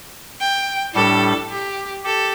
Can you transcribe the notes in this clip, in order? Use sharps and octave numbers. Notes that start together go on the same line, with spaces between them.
G5
A2 G3 D4 G4 A4
G4
G4 A4